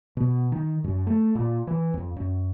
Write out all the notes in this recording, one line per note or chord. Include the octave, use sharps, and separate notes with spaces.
B2
D#3
F#2
A3
A#2
E3
F2
F#2